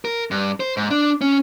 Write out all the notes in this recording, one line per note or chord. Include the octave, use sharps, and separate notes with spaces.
A#4
G2
C5
G#2
D4
C#4